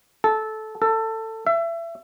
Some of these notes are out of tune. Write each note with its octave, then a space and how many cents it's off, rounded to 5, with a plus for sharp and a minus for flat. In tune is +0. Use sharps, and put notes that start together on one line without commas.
A4 -15
A4 +20
E5 +30